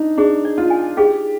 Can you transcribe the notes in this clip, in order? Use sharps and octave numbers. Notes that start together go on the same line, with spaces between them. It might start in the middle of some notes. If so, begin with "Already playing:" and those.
Already playing: D4 D#4
D4 G#4
D5
F4
G#5
G4 G#4